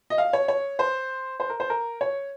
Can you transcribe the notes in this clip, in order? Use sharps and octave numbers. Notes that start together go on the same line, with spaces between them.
D#5
F5
C#5
C#5
C5
C5
A#4
C5
A#4
C#5